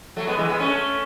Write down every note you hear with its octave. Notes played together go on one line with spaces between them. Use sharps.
F#3 A3
G#3 B3
E3 G#3
G#3 B3
A3 C#4